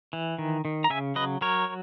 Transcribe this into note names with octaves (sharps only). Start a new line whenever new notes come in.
E3
D#3
D#3
A#5
C#3 E5 G#5
F#3 B4 D#5
F#3 A#4 C#5